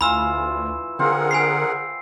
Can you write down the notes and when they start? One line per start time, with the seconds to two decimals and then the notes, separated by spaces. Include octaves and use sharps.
0.01 D2 E3 F4 B5 E6 E7
0.99 D3 C4 F4 G#4 A#4 F#5
1.31 G#5 B5 C7